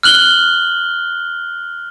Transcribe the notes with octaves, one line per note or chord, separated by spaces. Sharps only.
F6 F#6 F#7 G7